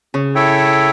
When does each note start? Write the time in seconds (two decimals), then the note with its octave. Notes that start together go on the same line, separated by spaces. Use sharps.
0.14 C#3
0.35 E4 A4 C#5 E5 G5